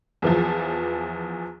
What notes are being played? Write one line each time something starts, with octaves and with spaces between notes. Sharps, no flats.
E2 E3 F3